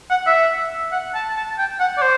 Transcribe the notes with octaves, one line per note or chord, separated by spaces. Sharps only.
F#5
E5
F#5
A5
A5
G5
F#5
D5
C5